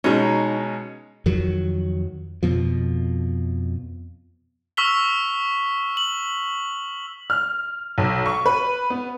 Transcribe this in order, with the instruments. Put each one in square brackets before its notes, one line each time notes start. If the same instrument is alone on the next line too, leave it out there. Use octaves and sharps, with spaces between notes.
[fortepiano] B2 G#3 C#4 [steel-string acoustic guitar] D#4 A#5
[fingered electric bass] F2 D#3 F#3
F2 B2 F3
[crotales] C#6 E6 F6 B6 F7 G7
F#7
[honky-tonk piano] F6
B1
C#6
B4
B3